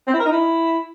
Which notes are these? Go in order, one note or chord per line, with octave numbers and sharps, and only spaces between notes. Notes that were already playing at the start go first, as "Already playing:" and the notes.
C4
E4
A#4
D#4
E4